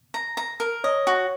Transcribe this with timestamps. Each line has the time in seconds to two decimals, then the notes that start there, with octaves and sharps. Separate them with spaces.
0.14 A#5
0.37 A#5
0.60 A#4
0.84 C#5 D#5
1.07 F#4